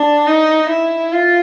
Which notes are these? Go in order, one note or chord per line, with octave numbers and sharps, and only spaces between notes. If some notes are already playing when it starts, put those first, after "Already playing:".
Already playing: D4
D#4
E4
F4